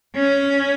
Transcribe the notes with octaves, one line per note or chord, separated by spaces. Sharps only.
C#4